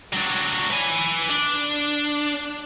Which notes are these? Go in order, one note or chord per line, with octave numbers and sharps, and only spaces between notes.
F#3 D4
B4 G#5
D4